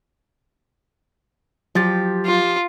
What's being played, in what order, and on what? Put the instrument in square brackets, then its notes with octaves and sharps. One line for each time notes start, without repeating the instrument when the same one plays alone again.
[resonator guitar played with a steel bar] F3 G4 [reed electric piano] F#3 A6
[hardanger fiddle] F4